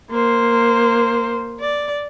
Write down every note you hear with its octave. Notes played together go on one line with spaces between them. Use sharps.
A#3 C5
D5